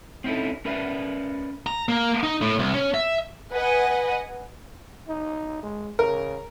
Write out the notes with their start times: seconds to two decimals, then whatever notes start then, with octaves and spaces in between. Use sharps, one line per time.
0.24 C4 C#4 D#4 E4 A4
0.65 C#4 A#4 B4 D5 E5
1.67 A#5
1.89 A#3
2.23 D#4
2.42 A2
2.59 C2
2.74 C#4
2.94 E5
3.52 B4 D#5 F#5 G#5
5.08 D#4
5.63 G#3
5.99 C#3 A#4